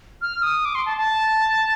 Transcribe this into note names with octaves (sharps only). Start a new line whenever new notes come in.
F6
D#6
D6
C6
A5
A5